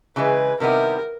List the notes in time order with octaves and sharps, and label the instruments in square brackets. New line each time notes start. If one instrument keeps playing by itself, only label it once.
[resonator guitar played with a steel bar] C#3 E3 G#3 [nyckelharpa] B4
[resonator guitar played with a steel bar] C3 D#3 G3 B3 E4 [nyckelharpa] A#4